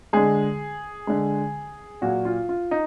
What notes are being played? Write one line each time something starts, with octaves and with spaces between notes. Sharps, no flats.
D3 G#3 G#4
D3 G#3
A#2 F#3 F#4
F4
F4
D#4